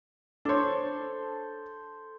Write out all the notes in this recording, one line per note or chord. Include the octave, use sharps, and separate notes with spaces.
D4 A4 C5 C#5